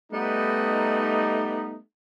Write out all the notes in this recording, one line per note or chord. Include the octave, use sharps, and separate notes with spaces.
G3 A3 B3 D#4